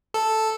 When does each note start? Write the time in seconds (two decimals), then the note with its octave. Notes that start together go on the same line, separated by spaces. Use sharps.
0.14 A4